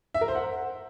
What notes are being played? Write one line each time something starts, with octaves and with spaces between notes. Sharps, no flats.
E5
A#4
C5
F#5